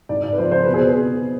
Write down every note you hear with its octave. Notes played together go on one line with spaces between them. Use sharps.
G#2 D5
D5
B4
F3 C5
C5
B2 B4
G#4
B4